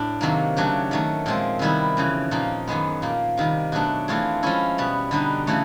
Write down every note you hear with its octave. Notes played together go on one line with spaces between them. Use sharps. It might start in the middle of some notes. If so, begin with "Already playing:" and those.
Already playing: A2 D4
C3 D#3 F#3 A#3
C#3 F#3 A3 D4 G4
D#3 F#3 A3
A#2 F3 G#3 C4
C3 D#3 G3 B3 E4
F2 C#3 E3
A#2 F3 A#3 D#4
F#2 D#3 G#3 B3
A#2 F3 A#3
C3 D#3 G3
B2 F#3 A3 D4
E3 A3 C4 F4 G#4
F3 G#3 C#4 E4
B2 G3 B3
D3 G3 B3 D#4
C#3 E3 A3